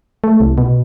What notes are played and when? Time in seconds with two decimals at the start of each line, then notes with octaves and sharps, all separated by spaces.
0.24 A3
0.40 C2
0.58 B2